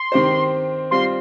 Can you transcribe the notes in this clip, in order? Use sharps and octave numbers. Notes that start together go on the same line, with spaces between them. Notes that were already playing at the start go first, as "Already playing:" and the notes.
Already playing: C6
D#3 C4 G4 C5
G3 C4 F4 C6